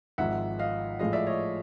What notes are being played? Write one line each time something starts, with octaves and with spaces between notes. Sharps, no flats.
G#1 G#2 F3 E5 F#5
D#5 F5
A2 F3 G#3 D#5 F5
D5 E5
C#5 D#5